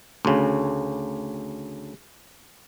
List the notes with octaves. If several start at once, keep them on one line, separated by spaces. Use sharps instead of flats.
D2 C#3